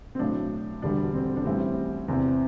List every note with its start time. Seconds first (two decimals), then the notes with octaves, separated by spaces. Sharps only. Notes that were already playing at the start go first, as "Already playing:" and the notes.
0.15 C4
0.19 B1 A2 F#3 D4
0.82 E1 D2 D3 G3 D4
1.14 C4
1.37 D4
1.45 A1 A2 E3 G3 C4
2.08 E2 C3 E3 C4